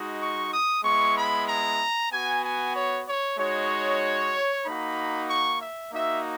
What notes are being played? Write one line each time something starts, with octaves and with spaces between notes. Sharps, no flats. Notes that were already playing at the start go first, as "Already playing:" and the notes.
Already playing: G#3 D#4 F#4
C#6
D#6
G#3 B3 E4 C#6
B5
A#5
B3 F#4 G#5
G#5
C#5
C#5
G#3 D#4 F#4 C#5
A#3 D#4 F#4 B5
C#6
E5
A#3 D#4 F#4 E5